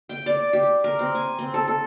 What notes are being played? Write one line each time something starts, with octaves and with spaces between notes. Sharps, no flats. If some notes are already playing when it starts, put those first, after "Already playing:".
G5
D5
G4
A#4
C4
G#5
C4
A4
A4